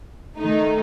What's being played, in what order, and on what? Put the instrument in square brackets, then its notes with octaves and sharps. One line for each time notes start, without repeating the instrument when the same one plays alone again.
[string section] D#3 A3 D#4